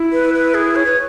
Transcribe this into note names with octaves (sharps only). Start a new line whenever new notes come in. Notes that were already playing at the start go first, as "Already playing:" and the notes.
Already playing: E4
B4
B4
G#4
C#5
B4